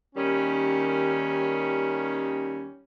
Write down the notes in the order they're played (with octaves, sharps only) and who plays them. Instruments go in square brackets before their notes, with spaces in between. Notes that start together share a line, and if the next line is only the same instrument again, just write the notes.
[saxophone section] D#2 D#3 G3 C#4